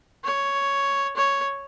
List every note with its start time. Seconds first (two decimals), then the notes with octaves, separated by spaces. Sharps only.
0.24 C#5
1.17 C#5